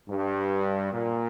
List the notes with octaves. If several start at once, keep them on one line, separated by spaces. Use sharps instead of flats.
G2
A#2